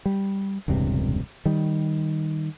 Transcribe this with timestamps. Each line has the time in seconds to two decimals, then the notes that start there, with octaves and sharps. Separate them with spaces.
0.06 G3
0.68 E1 C#2 G2 C3
1.45 D#3 G3